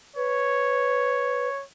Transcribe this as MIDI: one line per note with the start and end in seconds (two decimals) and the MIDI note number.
0.16 1.48 71
0.16 1.64 73